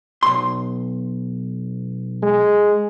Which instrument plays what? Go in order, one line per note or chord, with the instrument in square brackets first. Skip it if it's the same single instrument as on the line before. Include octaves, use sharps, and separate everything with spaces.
[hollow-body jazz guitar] B1 C6
[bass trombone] G#3